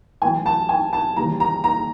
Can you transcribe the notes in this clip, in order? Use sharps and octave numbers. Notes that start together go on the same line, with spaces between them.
B1 A2 E3 G#5
A5
G#5
A5
D#2 C#3 E3 G3 A#5
A#5
A#5